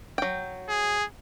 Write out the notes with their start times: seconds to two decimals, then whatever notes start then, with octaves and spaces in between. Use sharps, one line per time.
0.18 F#3 G5
0.69 G#4